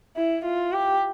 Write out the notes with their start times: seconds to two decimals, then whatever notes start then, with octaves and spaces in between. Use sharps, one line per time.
0.16 E4
0.44 F4
0.73 G4